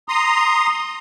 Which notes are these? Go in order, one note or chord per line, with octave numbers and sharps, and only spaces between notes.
A#5 C6 D#6